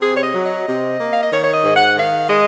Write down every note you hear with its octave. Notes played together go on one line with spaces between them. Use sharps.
C3 G#4
C#5
D#5
F#3
D#5
C3
A#3
F5
D#5
D#3 C#5
C#5
D#5
G#2
F#5
D#3 F5
G#3 D#5